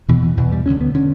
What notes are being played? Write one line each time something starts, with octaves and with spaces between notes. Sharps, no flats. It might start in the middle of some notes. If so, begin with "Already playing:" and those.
E2 B2 E3
E3
E2 B2 E3
G3
D2 D3 C#4
B3
D3 C#4